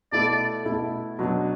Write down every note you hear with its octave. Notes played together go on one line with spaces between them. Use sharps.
B2 A3 E4 A4 D5
B2 A3 E4 A4
B2 F#3 D4